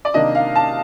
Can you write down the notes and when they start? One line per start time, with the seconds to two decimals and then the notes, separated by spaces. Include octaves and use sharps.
0.05 D5
0.14 C3 D#3 A#3 D4 D#5
0.35 F5
0.56 A5